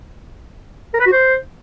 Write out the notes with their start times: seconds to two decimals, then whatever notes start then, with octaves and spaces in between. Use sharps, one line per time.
0.94 A#4
1.00 B4
1.06 F#4
1.12 C5